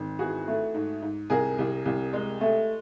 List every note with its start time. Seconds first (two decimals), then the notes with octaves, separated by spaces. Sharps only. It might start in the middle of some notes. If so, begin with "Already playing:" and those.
Already playing: G#1
0.19 E3 F#4 G#4
0.47 A3
0.74 G#2
1.02 G#2
1.30 C2 G#4 A#4
1.58 C2
1.85 C2
2.13 G#3
2.41 A3